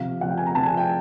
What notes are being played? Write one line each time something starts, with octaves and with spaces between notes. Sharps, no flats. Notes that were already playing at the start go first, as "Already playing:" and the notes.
Already playing: C3 F3 F5
C3 F3 F#5
G5
G#5
A#5
C3 F3 A5
G#5
G5